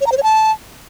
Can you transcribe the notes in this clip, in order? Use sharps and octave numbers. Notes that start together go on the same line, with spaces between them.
C#5
A#5
C5
C#5
A5